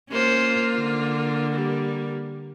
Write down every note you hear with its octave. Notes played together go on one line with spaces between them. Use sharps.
A#3 C#4 F4 C5
D3
G3 A#3